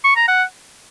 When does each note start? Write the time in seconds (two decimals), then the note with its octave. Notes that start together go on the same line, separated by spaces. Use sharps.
0.04 C#6
0.16 A#5
0.28 F#5